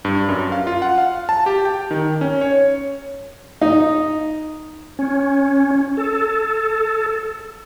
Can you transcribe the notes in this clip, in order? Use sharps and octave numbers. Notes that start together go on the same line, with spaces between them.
G2
F#2
F5
F4
F#5
F5
A5
G4
G5
D#3
C#4
C#5
D#4
C#4
A4